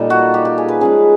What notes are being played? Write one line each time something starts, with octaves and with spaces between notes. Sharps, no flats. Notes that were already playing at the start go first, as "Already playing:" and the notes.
Already playing: A#2 D#3 G3 A#3 D#4 A4
F#4
G4
G4
G#4
B4
F3 G#3 C#4 G#4